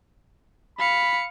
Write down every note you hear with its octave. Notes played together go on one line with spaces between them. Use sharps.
F5 B5 C#7